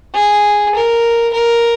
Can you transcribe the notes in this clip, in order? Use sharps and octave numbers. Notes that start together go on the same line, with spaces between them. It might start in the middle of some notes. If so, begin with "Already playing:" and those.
G#4
A#4
A#4